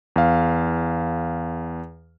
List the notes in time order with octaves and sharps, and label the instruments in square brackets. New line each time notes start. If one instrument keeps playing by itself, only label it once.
[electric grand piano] E2 F5